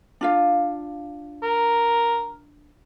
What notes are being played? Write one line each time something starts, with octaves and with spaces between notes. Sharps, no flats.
D4 F4 F5
A#4